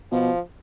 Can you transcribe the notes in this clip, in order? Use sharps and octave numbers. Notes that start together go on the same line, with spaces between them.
B2 F3